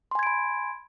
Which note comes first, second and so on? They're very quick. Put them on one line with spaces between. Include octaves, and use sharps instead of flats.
C6 G#5 G#6 D7 B5